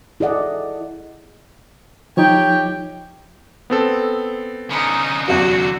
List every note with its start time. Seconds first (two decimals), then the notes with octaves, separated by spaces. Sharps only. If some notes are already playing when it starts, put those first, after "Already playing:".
0.20 E4 G#4 A4 D5 D#5 F#5
2.17 F3 D#4 G4 C#5 G5
3.70 B3 C4 A4
4.70 D3 C#4 D#4
5.28 E2 F#3 F#4